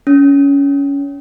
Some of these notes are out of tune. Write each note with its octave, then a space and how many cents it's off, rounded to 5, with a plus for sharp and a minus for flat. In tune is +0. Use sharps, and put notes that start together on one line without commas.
C#4 +20